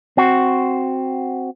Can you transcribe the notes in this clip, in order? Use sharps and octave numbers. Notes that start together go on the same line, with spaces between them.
C4 F#4